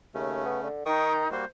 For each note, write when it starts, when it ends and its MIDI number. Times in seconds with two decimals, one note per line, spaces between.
0.14 0.42 39
0.14 0.68 49
0.14 0.68 57
0.14 0.68 61
0.46 0.59 59
0.63 0.85 50
0.86 1.30 51
0.86 1.30 63
0.86 1.13 79
0.86 1.13 85
0.86 1.13 87
1.31 1.45 55
1.31 1.45 58
1.31 1.45 66
1.31 1.45 72